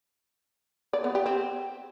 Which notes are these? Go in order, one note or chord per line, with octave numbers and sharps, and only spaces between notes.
D5
B3
G4
C4